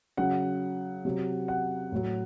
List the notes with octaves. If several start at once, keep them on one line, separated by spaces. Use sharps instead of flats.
C#3 F#3 F#5
C3 F#3
F#5
A2 F#3